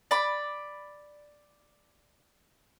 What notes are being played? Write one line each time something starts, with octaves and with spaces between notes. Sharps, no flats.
D5 B5